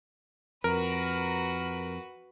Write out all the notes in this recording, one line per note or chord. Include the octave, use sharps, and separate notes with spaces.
F2 F#4 A#4 B4